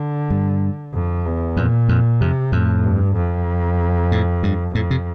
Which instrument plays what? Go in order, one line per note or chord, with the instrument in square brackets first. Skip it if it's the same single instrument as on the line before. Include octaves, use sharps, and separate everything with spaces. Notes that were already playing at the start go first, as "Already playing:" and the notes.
Already playing: [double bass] D3
[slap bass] G2
[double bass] F2
E2
[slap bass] F2 [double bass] A#2
[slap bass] F2
[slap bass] F2 [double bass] C3
[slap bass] F2 [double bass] A2
[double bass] G2
F2
[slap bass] A2
G2
[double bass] F2 [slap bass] A2
[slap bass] C3